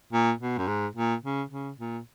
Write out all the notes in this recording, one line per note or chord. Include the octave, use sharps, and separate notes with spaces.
A#2
B2
F#2
G#2
A#2
C#3
C#3
A#2